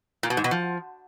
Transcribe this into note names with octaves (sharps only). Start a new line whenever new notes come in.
A#2
B2
G#2
B2
F3